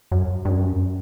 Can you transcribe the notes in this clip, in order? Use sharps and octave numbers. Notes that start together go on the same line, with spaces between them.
F#2
G2
F#2